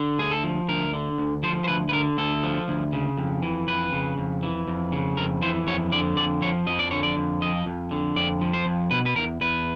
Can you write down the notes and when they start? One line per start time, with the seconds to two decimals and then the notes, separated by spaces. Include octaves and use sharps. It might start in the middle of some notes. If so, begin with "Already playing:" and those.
Already playing: D3
0.19 D2 G#4
0.31 A4
0.44 F3
0.68 D2 A#4
0.93 D3
1.18 D2
1.43 F3 C5
1.64 C5
1.68 D2 B4
1.89 B4
1.93 D3 A#4
2.18 D2 A4
2.43 F3
2.68 D2
2.92 C#3
3.18 F2
3.43 E3
3.68 F2 B4
3.93 C#3
4.18 F2
4.43 E3
4.68 F2
4.92 C#3
5.17 F2 A#4
5.42 E3 C5
5.67 F2 C#5
5.92 D3 D5
6.16 F2 D5
6.42 F3 C#5
6.67 F2 D#5
6.79 D5
6.91 D3 C#5
7.03 D5
7.17 F2
7.41 F3 D#5
7.66 F2
7.91 D3
8.16 F2 D5
8.41 F3
8.53 C5
8.66 F2
8.91 B2 B4
9.06 B4
9.16 E2 A#4
9.41 E2 B4